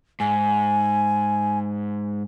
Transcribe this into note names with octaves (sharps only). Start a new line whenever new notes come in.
G#2 G#5